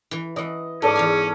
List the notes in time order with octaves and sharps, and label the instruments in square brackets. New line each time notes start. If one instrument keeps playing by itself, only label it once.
[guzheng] E3
[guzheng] E3 F#5 [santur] D#5
[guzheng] G#2 [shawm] C#4 [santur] A4 D5 D6
[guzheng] E2 F5 G#5